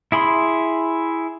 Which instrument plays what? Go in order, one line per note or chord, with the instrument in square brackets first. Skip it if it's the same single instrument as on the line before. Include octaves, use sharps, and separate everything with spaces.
[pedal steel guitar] E4 G#4 B5 C6